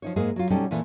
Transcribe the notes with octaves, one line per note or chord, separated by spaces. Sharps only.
F3 D#4 C#5
G#2 G#3 A#3 G#4
F#3 F4
B2 G3 C#4 D#4 A4 G5
A#2 E3 A3